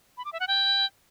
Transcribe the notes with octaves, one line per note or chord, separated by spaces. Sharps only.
B5
D6
E5
F#5
G5